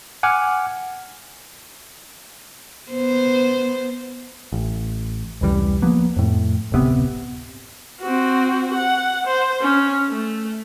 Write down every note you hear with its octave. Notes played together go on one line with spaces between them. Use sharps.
F#5 G#5 D6 F6
B3 C5
A1
F1 C#2 E3 G3
F3 A#3 B3
F2 A2
D1 G1 C3 B3
C4 F#4
F#5
C5
C#4
A3